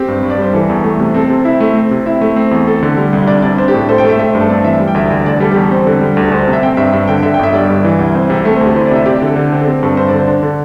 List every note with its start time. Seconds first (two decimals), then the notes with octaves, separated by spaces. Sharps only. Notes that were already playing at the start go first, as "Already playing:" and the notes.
Already playing: C4 G4
0.08 G2
0.23 G2
0.30 D5
0.38 G3 C5
0.53 E3 A4
0.69 E2
0.84 A3
1.00 C3
1.14 C4 A4
1.25 C5
1.29 C3
1.45 E4 E5
1.60 A3
1.75 C4
1.91 C3
2.06 E4 E5
2.21 A3
2.36 C4
2.51 E2
2.67 A4
2.83 D3
2.97 G3
3.13 C2
3.27 D4 D5
3.42 C3 D5
3.58 D4 C5
3.68 G4
3.74 A2
3.89 A4 C5
3.98 G5
4.04 A3 E5
4.19 A3 E5
4.30 C5
4.35 G2
4.40 A4
4.49 C4 D5
4.64 E3 E5
4.80 G3
4.88 G5
4.95 D2 E5
5.10 D2 D5
5.26 D3 D5
5.40 G3 A4
5.51 G4
5.56 E2
5.61 A4
5.71 C4 C5
5.87 D3
6.01 G3
6.17 D2
6.24 A4
6.31 D2 C5
6.48 C3
6.53 E5
6.63 C4 G5
6.77 G2 E5
6.93 G2 E5
7.08 D3 G5
7.23 D3 E5
7.34 G5
7.39 G1 E5
7.53 G3 D5
7.70 G2
7.84 E3
7.99 C2
8.15 C4 C5
8.30 C3 G4
8.45 A3 A4
8.55 C5
8.61 D2 G4
8.75 E4 C5
8.86 D5
8.91 C3 E5
9.06 G4 D5
9.16 E5
9.22 D3 A4
9.36 D3
9.52 C4
9.61 A4
9.66 C4 G4
9.83 G2 A4
9.97 G2 C5
10.08 D3 D5
10.20 C5
10.28 D4
10.43 D3